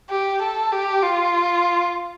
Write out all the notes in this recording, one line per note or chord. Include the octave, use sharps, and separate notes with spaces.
G4
A4
G4
F4